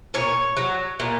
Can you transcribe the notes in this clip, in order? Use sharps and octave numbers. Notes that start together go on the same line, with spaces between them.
A#2 C#5
F#3
A#2